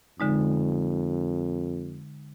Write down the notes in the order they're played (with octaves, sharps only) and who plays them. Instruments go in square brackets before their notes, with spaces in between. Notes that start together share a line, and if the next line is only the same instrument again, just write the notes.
[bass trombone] F2 [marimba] D3 G#3 D#4